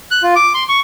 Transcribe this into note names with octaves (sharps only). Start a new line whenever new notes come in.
F#6
F4
D6
C6
C#6